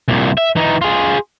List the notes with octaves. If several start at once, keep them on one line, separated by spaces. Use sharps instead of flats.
C2 A#2
E5
E3 D#4
F4 G#4